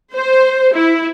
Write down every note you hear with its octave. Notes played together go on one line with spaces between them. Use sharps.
C5
E4